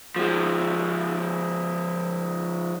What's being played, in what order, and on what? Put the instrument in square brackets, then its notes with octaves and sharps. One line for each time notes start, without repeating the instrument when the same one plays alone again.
[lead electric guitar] F3 G#3